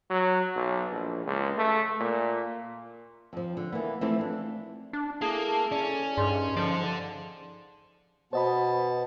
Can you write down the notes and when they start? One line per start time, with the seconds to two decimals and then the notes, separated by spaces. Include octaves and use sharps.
0.10 F#3
0.56 B1
0.91 A#1
1.26 C#2
1.58 A3
2.00 A#2
3.33 F2 F3
3.57 D3
3.72 E3 A#3 B3
4.01 E3 F3 A3 B3 C4 E4
4.21 D4
4.93 D4
5.22 A#3 E4 G#4 A4 A5
5.72 C#4 D5
6.17 G2 G3 D#4 G#4 C6
6.57 F3 D4 A4
8.33 B2 B3 C5 D#5 A5 B5